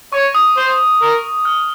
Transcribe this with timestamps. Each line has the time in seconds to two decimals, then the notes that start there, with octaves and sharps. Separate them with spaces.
0.12 C#5 C#6
0.35 D#6
0.57 C5
1.01 A#4
1.45 F6